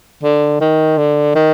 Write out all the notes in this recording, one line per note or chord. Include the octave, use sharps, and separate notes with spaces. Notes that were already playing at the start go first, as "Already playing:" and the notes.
D3
D#3
D3
D#3